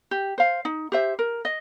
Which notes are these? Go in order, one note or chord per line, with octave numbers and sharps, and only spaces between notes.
G4
C5 F5
D#4
G4 C5 E5
A#4
D#5